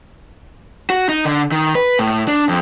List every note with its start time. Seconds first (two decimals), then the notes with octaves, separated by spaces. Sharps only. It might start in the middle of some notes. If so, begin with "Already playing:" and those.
0.90 F#4
1.09 D#4
1.25 D3
1.52 D#3
1.75 B4
1.99 A2
2.28 D4
2.49 F2